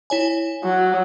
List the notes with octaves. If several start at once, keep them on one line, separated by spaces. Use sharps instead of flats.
E4 C#5 G#5
F#3